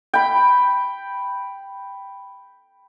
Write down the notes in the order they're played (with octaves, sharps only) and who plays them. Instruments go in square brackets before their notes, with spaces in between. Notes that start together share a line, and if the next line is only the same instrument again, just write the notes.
[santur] G5 B5